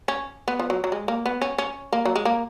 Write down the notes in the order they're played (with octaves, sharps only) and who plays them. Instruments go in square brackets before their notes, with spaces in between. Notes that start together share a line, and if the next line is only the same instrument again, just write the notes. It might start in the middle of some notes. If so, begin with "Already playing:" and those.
[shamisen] C#4
B3
F3
F#3
F#3
G#3
A#3
B3
C#4
C#4
A#3
F#3
G#3
A#3